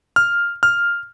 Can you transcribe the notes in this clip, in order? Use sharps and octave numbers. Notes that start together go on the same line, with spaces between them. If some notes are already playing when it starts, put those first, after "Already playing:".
F6
F6